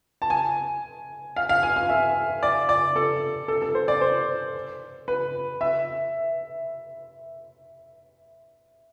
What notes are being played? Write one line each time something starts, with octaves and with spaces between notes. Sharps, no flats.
A5
G#5
F5
F5
G#5
G#5
E5
D5
D5
A4
A4
A4
C5
D5
C5
B4
E5